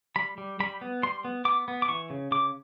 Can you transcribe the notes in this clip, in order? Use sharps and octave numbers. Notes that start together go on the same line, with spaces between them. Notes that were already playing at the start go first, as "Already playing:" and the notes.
G3 B5
G3
G3 B5
B3
G3 C6
B3
B3 D6
B3
D6
E3 C#6
C#3
C#3 D6